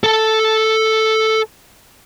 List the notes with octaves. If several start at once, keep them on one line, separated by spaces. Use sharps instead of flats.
A4 A5